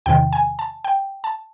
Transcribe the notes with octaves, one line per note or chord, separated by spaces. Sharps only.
E2 C3 D#3 G5
G#5
A5
G5
A5